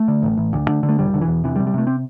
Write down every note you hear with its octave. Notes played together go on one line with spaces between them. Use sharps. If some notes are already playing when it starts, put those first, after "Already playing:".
Already playing: A3
D3
A1
A1
D2
D3
D3
A3
E1 G3
E1 D3
E3
E2
C3 E3
G3
C3
G3
C3 A3
C4